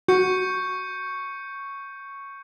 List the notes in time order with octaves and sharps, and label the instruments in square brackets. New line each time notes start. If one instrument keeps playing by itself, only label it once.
[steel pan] F#4 [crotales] C#6 G6 C#7